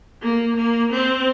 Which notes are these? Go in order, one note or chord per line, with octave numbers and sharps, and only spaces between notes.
A#3
A#3
C4